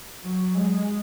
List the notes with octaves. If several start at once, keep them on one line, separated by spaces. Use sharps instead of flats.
F#3
G#3